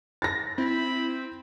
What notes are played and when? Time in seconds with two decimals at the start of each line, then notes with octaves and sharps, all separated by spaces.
0.22 A6 A#6
0.58 C4 E4 B5